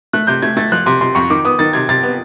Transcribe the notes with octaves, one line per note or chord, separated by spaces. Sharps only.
A3 F#6
C3 G6
A3 G#6
A3 A6
F3 F#6
C3 C6
C3 C6
F2 C#6
D#3 D6
B3 D#6
D#3 A6
C3 G#6
C3 A6
B3